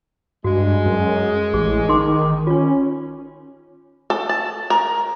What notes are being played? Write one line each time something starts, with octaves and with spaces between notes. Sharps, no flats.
G2 G#3 F#4
F#2
A1 G#4
D#3 D#4 C6 D6
C#4 F4 C#5
A4
A5
A#4